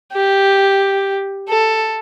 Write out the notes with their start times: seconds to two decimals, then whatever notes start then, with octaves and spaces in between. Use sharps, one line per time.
0.13 G4
1.49 A4